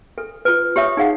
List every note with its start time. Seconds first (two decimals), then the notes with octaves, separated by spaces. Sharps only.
0.18 A4
0.45 F4 B4
0.76 G4 C#5 E5 D#6
0.97 D#4 G#4 F5 F#5